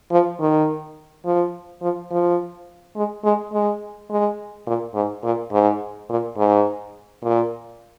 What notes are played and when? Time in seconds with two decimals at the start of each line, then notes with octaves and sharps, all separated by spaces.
0.11 F3
0.40 D#3
1.26 F3
1.82 F3
2.11 F3
2.96 G#3
3.24 G#3
3.53 G#3
4.10 G#3
4.67 A#2
4.95 G#2
5.24 A#2
5.52 G#2
6.10 A#2
6.37 G#2
7.23 A#2